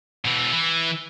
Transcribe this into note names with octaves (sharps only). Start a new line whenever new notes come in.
B2 E3
E3